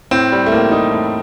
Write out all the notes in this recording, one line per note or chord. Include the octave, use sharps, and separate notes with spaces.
A2 C4
G3
A3
A2 A#3
G3 D#4
A2